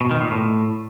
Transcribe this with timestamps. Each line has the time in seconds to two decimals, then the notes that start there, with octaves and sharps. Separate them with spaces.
0.01 B2
0.11 D#3
0.21 A#2
0.31 A2